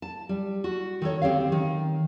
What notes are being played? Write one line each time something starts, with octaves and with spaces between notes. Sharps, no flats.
A5
G3
F#4
D#3 A4 C#5
D2 C4 G4 C#5 F5
D#3